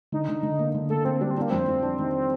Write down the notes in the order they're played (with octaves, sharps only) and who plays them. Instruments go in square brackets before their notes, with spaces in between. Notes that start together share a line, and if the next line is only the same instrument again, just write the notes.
[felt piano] D3 [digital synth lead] D#4
[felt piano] D3
D3
A#3
D3
[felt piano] A#3 [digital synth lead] A4
[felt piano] A#3 [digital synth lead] C4
[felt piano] G3 [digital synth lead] D4
[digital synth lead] C4
[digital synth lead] A#3 [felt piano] D4
[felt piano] F2 [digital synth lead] C4
[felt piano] F2
D4
D#3